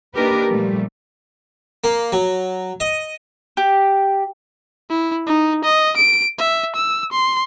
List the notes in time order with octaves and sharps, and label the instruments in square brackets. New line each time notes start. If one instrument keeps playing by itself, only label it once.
[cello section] A#3 D4 D#4 G4 A#4 B4
A#2 F3 G3 A3
[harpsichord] A#3
F#3
D#5
[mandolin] G4
[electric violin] E4
D#4
D#5
D7
E5
E6
C6